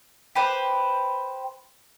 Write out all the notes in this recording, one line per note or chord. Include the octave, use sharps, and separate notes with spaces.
G4 B4 C5